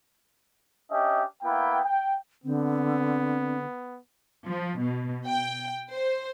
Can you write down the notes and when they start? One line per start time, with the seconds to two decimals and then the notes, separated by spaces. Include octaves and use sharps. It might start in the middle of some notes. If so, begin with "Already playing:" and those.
0.91 C#4 D4 G4 D#5 E5
1.43 A#3 B3 E4 G5
1.85 G5
2.44 D3 B3 C4
4.46 F3
4.80 B2
5.26 G5
5.91 C5